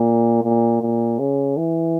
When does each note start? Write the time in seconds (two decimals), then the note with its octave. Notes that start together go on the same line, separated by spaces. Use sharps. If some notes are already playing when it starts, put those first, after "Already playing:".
Already playing: A#2
0.43 A#2
0.81 A#2
1.19 C#3
1.57 E3